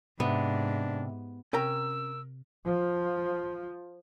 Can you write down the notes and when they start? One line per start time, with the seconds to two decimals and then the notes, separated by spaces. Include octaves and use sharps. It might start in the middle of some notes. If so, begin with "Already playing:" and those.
0.20 G#2 C3 B3 D4
1.53 C3 C#4 A#4 G5 A#5 E6
2.67 F3